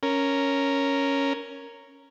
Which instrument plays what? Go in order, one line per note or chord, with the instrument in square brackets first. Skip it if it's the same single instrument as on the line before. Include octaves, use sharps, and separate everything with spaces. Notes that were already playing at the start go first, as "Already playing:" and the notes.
[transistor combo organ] C#4 A#4